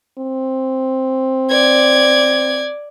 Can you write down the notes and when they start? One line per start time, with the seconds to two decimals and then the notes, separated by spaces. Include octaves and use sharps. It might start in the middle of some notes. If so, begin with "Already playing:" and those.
0.18 C4
1.50 D5 G#6